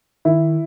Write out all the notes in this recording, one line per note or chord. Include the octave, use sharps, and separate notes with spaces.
D#3 E4